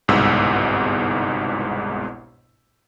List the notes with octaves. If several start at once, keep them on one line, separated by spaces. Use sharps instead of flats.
G1 C2 G#2 B2 E6